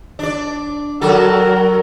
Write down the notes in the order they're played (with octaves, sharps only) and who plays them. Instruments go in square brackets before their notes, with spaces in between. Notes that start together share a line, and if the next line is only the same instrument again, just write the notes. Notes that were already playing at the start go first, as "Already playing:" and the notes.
[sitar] D4 D5
[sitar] F#3 F#4 A4 [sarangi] A#4